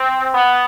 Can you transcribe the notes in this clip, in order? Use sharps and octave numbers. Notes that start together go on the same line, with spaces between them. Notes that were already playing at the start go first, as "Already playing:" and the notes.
Already playing: C4
B3